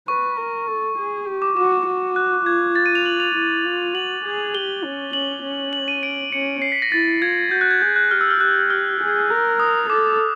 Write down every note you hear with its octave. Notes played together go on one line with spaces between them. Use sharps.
B4 C#6
A#4
A4
G#4
G4
D6
F#4 D6
F#4
F#6
F4 G#6
A6
D#7
F7
F#7
F7
E4
F4
F#4 F#7
G#4
G4 G7
C#4
C#4 F#7
C#4
F#7
D#7
D7
C#4 C#7
C7
B6
A#6
E4 A6
F4 G#6
F#4 G6
F#6
G#6
G#4 G6
F#6
G4 F6
E6
F6
G4 F#6
F6
G#4
A#4
D#6
A4 D6